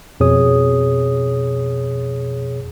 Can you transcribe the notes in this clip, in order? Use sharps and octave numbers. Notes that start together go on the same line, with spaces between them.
F2 B2 G#4 C#5 D#6